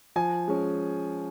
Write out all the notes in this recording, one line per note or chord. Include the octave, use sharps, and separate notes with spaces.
F3 G#5
G#3 C#4